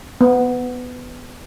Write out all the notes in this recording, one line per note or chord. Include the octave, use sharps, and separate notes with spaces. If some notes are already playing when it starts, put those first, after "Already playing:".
B3